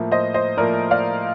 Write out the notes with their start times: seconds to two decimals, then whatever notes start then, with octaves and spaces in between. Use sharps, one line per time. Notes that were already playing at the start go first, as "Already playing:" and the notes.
Already playing: A2 F3 A#3
0.12 C5 D#5
0.34 C5 D#5
0.57 A2 F3 A#3 A#4 D5
0.91 D5 F5